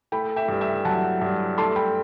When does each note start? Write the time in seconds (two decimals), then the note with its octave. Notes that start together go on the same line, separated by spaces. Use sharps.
0.12 A3 G5 B5
0.36 E5 G5
0.48 G2
0.61 E5 G5
0.85 F#3 F#5 A5
1.21 G2
1.58 A3 A5 C6
1.76 G5 B5